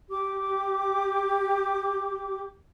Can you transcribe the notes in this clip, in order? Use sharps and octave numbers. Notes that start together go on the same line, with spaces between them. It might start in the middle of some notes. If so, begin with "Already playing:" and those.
G4 D6